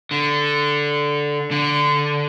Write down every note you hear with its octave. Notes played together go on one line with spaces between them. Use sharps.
D3
D3